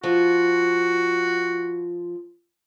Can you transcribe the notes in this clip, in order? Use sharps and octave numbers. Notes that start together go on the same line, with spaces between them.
F3 F#4